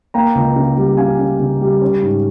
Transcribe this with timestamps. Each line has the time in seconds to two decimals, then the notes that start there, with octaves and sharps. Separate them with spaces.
0.14 A#3 G5 A#5
0.35 C#2
0.56 C#3
0.77 G3
0.97 C#3 F5 G#5
1.19 C#3
1.40 C#3
1.61 G3
1.82 C#4
2.02 G#2